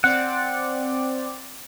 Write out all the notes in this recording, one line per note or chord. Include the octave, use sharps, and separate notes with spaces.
C4 D5 F#5